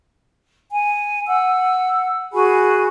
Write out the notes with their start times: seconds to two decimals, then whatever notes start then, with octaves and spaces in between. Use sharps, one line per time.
0.72 G#5
1.28 F#5 E6
2.34 F#4 G#4 G#5 B5